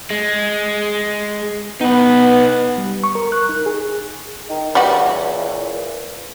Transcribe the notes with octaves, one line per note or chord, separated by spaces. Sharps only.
G#3
B3 D#4 B4
G3
C#6
A#4
F#6
D#4
G#4
D#3
C#2 A#2 E3 G3 F#4